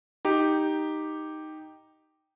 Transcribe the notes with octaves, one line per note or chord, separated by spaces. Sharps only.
D#4 G4